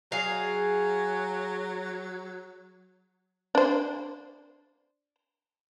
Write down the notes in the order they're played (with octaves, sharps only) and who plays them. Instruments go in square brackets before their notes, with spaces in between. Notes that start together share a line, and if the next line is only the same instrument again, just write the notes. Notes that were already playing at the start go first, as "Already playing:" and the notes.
[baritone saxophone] F#3 [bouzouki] G#4 F5
[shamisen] D4 C5